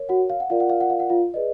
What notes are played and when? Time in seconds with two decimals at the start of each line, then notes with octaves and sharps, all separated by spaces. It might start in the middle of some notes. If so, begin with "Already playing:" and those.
Already playing: A#4 C#5
0.09 F#4 F#5
0.30 F5
0.40 F#5
0.50 F4 A#4 D5 F5
0.60 F#5
0.69 F5
0.81 F#5
0.90 F5
1.00 F#5
1.09 F4 F5
1.34 G#4 B4 D5 D#5